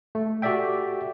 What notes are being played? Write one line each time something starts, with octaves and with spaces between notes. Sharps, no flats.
A3
F#4 G4 A4 D5 E5 G5